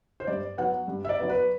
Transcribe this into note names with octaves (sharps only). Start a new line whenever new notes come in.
C5
G2 D5
F#3 B3 F#5
G2
E5
D5
F#3 B3
B4